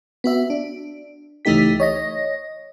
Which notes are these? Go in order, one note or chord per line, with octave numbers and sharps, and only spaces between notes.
B3 F#4 E5
D4
C#2 E3 A3 D#4 G4 B6
C#5 D#5 A#6